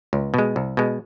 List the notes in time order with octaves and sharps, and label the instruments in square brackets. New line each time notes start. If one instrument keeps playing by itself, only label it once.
[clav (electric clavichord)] C#2
B2 G#3
C2
B2 G#3